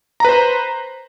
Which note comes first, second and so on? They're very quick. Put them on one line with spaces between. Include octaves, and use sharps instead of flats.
A#5 B4 C5